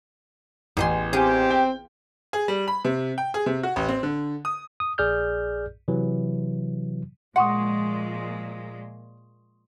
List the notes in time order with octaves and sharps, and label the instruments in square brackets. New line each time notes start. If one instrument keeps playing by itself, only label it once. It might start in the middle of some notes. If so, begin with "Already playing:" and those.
[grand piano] A1 [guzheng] E2 G#4 C6
[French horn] C4 [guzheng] F4 G#4 [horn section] G4
[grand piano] G5
G#4
G3
B5
C3
G5
G#4
C3
F#4
A1
C4
D3
D#6
[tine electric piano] D#6
A#1 G#4 D5 F6 G6
C3 E3 F#3
[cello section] A#2 F3 G#3 [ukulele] F#5 [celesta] C6 C#6 D#6